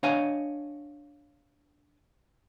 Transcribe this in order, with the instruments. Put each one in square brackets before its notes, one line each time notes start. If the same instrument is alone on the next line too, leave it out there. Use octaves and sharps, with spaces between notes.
[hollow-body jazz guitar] D4 C#5 D#5 F5 F#5 G#5